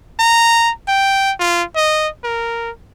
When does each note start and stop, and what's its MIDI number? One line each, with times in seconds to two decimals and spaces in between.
0.19 0.71 82
0.88 1.32 79
1.39 1.63 65
1.76 2.08 75
2.24 2.70 70